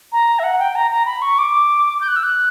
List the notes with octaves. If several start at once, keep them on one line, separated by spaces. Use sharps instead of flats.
A#5
E5
F#5
G5
A#5
A#5
B5
C#6
D6
G6
F#6
E6
F#6